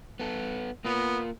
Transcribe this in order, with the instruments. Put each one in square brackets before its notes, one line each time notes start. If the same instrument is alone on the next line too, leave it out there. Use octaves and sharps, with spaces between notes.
[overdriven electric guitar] B3 A4
[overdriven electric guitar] A#3 F4 [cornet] B3